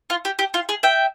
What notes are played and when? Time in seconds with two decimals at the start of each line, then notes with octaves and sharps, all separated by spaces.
0.10 F4
0.25 G4
0.39 G4
0.54 F4
0.69 G#4
0.83 E5 G5